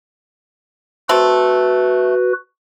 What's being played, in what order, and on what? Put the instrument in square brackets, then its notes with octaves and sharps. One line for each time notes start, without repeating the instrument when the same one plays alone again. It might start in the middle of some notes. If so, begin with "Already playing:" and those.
[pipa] A3 C4 [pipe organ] F#4 B4